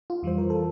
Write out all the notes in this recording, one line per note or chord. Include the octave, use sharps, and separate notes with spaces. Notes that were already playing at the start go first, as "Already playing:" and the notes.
F4
F2 E3 G3 C5
A#4
A4